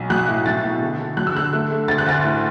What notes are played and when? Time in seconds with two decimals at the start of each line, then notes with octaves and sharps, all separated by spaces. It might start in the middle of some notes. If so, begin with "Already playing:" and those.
Already playing: B1
0.10 F#3 F#6
0.28 A2
0.46 B1 A6
0.64 B2
0.81 D3
0.99 D3
1.17 F#3 F#6
1.27 E6
1.35 D3 F#6
1.53 A3
1.70 A3
1.88 D2 A6
1.98 F#6
2.06 D2 A6
2.24 A2